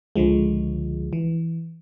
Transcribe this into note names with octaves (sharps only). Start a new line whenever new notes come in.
C#2 D3 F3 G#3
E3